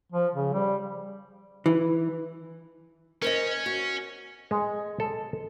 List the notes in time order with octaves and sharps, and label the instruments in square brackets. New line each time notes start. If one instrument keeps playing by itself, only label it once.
[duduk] F3
C#3
G3
[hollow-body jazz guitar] E3
[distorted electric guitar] C#4 [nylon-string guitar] A#4 C5 D#5
[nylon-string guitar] F#4
[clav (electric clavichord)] G#3
A4